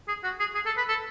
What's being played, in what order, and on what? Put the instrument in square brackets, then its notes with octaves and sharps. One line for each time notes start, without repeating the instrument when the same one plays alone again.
[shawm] G#4
F#4
G#4
G#4
A4
B4
A4